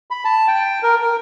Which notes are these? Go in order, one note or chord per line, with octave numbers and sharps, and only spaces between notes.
B5
A5
G5
A#4
A#4